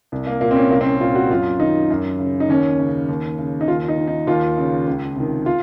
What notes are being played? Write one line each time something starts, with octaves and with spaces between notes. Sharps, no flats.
C2
A#3
A#2 A#3
C4
C#4
C2 A#3
C4
C#4
A#2 F4
F#4
F#2 F4
D#3 D#4
F#2
C#3
D#4
D#2 C#4
C#3
D#2
C#3
D#4
D#2 F4
D#4
D#3
D#4
D#2 F4
C#3
C#2
C3 D#3
F4